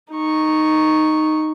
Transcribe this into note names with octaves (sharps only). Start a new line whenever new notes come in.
D#4 C#6